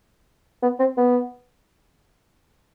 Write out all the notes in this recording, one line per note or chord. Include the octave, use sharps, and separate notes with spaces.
B3
C4
B3